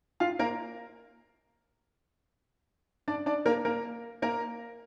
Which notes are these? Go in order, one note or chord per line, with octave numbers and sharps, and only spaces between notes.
F4 F5
A#3 A#4
D4 D5
D4 D5
A#3 A#4
A#3 A#4
A#3 A#4